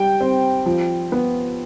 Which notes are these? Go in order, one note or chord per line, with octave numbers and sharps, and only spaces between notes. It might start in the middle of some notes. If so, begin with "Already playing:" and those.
Already playing: G3 G5
C4
F3
B3